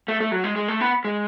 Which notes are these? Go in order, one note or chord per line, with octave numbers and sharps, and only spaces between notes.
A3
A3
F#3
G#3
G#3
A3
B3
G#3